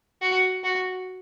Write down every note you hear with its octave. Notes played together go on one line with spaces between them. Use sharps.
F#4
F#4